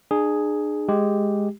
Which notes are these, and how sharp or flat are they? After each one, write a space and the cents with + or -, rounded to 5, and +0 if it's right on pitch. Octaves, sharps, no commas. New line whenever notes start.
D4 +40 G#4 +0
G#3 +0 G4 +0